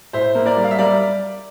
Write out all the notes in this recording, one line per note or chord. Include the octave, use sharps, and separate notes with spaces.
A2 C5 E5
A#3
A#4 D5
G3
F5
E5
G3 A#4 D5